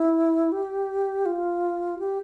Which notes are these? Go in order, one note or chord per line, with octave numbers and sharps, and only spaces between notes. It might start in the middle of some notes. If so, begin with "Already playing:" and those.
Already playing: E4
G4
F4
G4